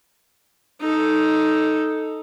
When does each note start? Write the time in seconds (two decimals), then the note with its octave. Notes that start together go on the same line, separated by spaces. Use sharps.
0.81 D#4 A4